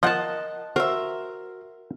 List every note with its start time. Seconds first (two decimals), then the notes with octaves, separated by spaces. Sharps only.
0.03 F3 F4 A#4 D#5 F#5 A5
0.76 F#4 A#4 C5 E5